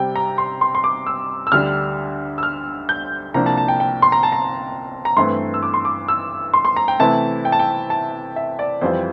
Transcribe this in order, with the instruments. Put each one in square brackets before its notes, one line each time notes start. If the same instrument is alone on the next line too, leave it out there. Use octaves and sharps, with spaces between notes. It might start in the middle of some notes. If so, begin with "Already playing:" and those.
Already playing: [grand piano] C3 G3 C4 G5
A#5
C6
C6
C6
D6
E6
E6
D2 D3 G3 D4 F6
E6
F6
G6
C2 C3 F3 A#3 D4 A#5
A5
A5
G5
G5
C6
A#5
A5
A#5
A#5
G2 E3 A3 C4 C6
E6
D6
C6
D6
E6
C6
C6
A#5
G5
C3 E3 A3 C4 E4 A5
G5
A5
G5
A5
E5
D5
F2 E3 G3 C4 F4 C5